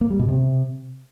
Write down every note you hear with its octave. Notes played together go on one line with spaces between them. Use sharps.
A#3
G3
B2
C3